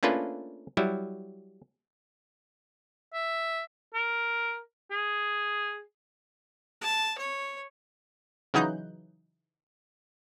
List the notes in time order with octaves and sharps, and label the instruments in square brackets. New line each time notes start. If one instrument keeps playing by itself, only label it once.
[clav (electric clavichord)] A3 A#3 C#4 D4 F4 B4
F#3 G3 E4
[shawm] E5
A#4
G#4
[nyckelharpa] A5
C#5
[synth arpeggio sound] C#3 E3 F#3 D#4 F#6 G6